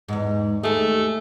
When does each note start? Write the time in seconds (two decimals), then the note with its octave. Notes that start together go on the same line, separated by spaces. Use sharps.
0.08 E2 G#2
0.63 D#2 A3 G#4